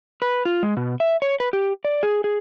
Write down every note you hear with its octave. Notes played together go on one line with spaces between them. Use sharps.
B4
F4
G#3
B2
E5
C#5
B4
G4
D5
G#4
G#4